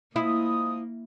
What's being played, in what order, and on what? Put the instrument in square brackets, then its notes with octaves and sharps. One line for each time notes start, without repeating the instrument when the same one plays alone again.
[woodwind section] F3 G#3 D#6 [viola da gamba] A#3 [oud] E4